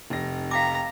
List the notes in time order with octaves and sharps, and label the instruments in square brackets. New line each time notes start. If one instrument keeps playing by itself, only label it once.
[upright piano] F1 A#6
[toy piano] F5 G5 D6 [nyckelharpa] A#5